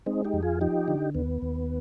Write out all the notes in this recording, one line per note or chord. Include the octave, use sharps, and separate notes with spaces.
G#3 C4 D#4
D#4 G4
F2
F4 G#4
F3 D#4 G4
D3
D#2 B3
D#2